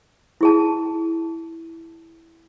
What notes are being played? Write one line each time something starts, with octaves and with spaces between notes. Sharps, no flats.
E4 G#4 A5